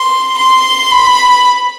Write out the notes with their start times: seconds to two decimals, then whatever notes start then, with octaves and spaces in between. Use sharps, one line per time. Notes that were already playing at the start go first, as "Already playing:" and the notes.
Already playing: C6
0.38 C6
0.92 B5